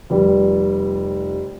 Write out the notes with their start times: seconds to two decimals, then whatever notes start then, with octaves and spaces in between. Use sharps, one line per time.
0.10 F1 G3